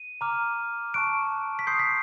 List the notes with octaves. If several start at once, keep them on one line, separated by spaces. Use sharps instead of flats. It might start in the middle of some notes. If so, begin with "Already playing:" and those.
Already playing: D#7
A#5 D6 F6
A5 C#6 F#6 D7
B6
C6 D#6 G6 C7
B6